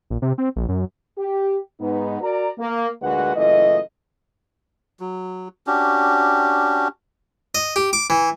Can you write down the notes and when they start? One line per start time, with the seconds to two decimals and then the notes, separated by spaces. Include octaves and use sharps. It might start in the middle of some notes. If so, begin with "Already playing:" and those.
0.10 A#1
0.22 C3
0.38 C4
0.56 A#1
0.69 F#2
1.18 G4
1.80 G#2 B3 D#4
2.22 F#4 A#4 D5 A#5
2.59 A#3
3.02 D2 A#2 G#3 F#4 B4 F#5
3.36 F#1 E3 A3 F4 D#5
5.00 F#3
5.67 C#4 D4 F#4 G4
7.55 D#5
7.76 G4
7.93 D6
8.10 E3